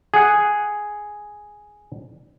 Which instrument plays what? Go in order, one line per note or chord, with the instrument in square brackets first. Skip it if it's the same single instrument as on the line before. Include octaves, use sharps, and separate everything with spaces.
[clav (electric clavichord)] G#4 F#5